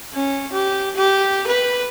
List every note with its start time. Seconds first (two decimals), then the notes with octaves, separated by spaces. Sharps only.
0.14 C#4
0.53 G4
0.96 G4
1.47 B4